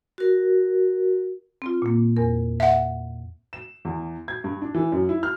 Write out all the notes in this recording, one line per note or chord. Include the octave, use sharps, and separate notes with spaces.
F#4 A#4
C4 F4
A#2 A#3
E2 A#4
E5 F#5
E7
E2
G#6
G2
D4
E3
F#2
E4
F6